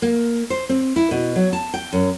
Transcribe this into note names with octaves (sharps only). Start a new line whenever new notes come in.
A#3
C5
C4
E4
B2
F#3
A5
G5
F#2